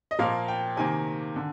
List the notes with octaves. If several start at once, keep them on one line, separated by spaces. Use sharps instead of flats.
D#5
A#2 F3 A#3 F5
G5
C3 D#3 A#3 G#5
D3